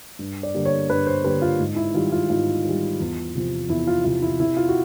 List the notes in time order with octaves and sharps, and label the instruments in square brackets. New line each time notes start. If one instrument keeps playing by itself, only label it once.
[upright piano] G2
D5
D3 G3 A#3
C#5
G2 B4
C5
D3 G3 A#3 B4
F4
G#2
E4
D#3 G3 F4
F4
G#2 F4
D#3 G3
E2
C3 F3
E2 E4
F4
C3 F3 F4
E4
C3 E4
F4
F#4